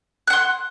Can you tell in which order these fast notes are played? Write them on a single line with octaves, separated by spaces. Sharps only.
F#6 F#5 C6